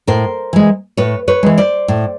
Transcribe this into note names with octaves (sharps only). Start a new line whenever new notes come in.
A2 A#4 C5
E3 G#3
A2 B4 C#5
B4 C#5
E3 G#3
C5 D5
A2